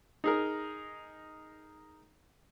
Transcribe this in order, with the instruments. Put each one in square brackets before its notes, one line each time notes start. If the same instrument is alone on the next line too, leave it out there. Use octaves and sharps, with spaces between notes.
[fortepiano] D#4 G#4 A#4